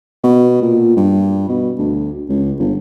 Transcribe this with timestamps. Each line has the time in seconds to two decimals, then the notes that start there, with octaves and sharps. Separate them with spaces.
0.24 B2
0.62 A#2
0.97 G2
1.49 B2
1.78 D2
2.29 C#2
2.59 G1